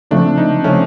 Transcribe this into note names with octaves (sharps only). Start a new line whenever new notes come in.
C#3 F3 A3 C4 D4
D#4
C#3 F3 A3 C4 C#4